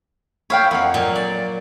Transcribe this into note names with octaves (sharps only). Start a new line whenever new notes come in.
E4 C#5 F5 G5
F2 A#4 F#5
A#2 F#3
D5